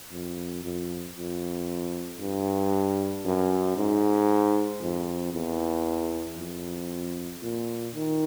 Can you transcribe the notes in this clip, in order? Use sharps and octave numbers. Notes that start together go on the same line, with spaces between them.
F2
F2
F2
G2
F#2
G#2
F2
E2
F2
A#2
D#3